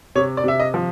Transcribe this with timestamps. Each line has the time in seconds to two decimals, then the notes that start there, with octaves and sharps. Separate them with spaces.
0.15 C3 C#5
0.37 D5
0.44 C3 E5
0.60 D#5
0.74 F3